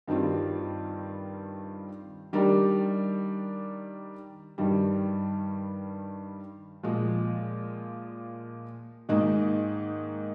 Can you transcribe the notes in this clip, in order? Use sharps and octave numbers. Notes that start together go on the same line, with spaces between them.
G2 D#3 G3 C4 F4
D#3 G3 D4 G4 A#4
G2 D#3 G3
A#2 F3 G#3
G#2 D#3 A#3 D#4 G#4